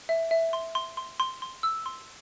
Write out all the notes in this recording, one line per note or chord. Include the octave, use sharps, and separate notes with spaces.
E5
E5
C6
C6
C6
C6
C6
E6
C6